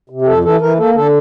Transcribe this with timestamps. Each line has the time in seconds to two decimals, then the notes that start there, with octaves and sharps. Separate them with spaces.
0.10 C3
0.22 G4
0.27 F2 A4
0.44 E3 A4
0.61 E3 A#4
0.78 A#3 A4
0.95 D3 A4